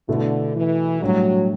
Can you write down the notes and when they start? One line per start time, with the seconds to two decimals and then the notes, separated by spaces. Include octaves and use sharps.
0.08 B2 D3 A3 E4
0.55 E3
1.01 A2 F#3 G3 D4 F#4